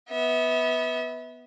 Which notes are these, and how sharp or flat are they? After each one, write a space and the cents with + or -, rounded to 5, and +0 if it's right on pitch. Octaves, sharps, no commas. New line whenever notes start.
B3 +0 E5 -30